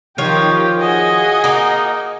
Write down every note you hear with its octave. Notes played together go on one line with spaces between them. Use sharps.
D#3 F3 F4 G4 C#5
F#4 G#4 D#5
A#3 D#4